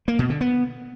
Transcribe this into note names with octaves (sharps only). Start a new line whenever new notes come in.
A#3
B2
D3
B3